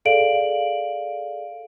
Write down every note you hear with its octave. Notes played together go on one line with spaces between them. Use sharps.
G#4 A4 D5 F5 D7 F#7